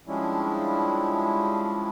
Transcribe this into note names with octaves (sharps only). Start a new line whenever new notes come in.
F3 G3 G#3 C#4 D4 E4